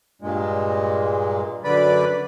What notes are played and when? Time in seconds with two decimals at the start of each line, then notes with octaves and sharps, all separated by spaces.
0.22 G2 A#2 G#3
1.64 F#2 D3 B4 D5 B5